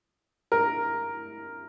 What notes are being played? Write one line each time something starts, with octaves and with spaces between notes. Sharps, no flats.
A#4